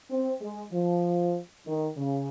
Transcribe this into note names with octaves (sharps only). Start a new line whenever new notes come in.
C4
G#3
F3
D#3
C#3